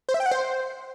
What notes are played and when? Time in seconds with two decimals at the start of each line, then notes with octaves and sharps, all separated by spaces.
0.09 C5
0.14 E5
0.20 G5
0.26 F#5
0.32 C5